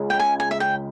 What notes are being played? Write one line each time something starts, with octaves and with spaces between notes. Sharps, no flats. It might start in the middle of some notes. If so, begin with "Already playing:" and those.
Already playing: C#2 C#3 G#3
G5
G#5
G#5
E5
G5